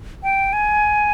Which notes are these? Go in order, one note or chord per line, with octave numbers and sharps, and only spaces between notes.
G5
G#5